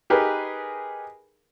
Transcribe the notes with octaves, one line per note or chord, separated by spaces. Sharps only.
D#4 G4 G#4 A#4 B4